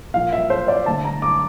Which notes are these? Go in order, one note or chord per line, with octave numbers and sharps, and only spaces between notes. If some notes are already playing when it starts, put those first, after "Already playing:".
A#2 F3 A#3 F5
E5
C5
D5
D3 A3 A5
A#5
D6